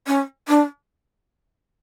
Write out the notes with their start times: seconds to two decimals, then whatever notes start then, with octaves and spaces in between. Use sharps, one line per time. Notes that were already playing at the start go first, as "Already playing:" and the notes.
0.07 C#4
0.48 D4